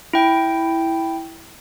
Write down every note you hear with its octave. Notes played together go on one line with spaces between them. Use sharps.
E4 G5